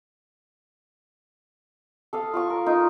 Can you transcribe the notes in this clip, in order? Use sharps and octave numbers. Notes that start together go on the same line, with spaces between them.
A4 F5 D#6
F4 F5 C#6
A#4
D#4 F4